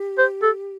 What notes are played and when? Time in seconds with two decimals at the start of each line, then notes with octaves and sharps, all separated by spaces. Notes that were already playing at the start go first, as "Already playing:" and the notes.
Already playing: G4
0.18 C5
0.42 A4